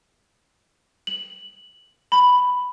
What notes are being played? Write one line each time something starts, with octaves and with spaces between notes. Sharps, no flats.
F#7
B5